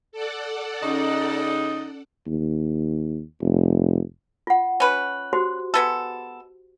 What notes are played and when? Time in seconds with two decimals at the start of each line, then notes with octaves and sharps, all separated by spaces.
0.12 A4 D5 F#5
0.83 C#3 C#4 D#4
2.26 D#2
3.41 F1
4.47 F4 F#5
4.80 C#4 B4
5.33 F#4 G4 C5
5.74 G#3 B3 A4